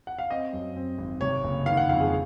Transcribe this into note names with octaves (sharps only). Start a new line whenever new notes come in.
F#5
F5
C4 D#5
F#2
C4
G#1
C3 C#5
F#1
D#3 F5
F#5
F2 F5
G#4